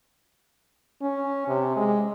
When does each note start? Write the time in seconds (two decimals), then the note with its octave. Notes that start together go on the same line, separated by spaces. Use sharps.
1.02 C#4
1.48 C3
1.77 G#3